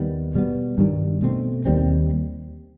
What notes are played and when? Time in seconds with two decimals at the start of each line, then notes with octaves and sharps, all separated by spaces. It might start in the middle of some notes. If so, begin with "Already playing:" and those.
Already playing: D#2 D#3 G3 B3
0.35 B2 G3 B3
0.78 G2 D#3 G3
1.22 B2 A3 C4
1.65 D#2 D#3 G3 C4